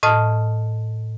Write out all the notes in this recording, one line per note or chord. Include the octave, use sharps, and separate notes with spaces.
A2 D#5 A5 D#6 F6